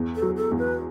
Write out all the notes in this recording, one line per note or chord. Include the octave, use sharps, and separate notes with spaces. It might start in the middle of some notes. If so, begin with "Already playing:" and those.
Already playing: E2
A4
F#3
A4
E2
B4